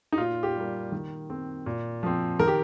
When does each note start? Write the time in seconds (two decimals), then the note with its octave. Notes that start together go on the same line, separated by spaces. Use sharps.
0.13 D#4
0.18 A#2 F4
0.43 G4
0.56 G3 A#3
0.92 D#3
1.30 C4
1.66 A#2
2.03 F3 C4
2.39 D#3 A#4
2.47 G4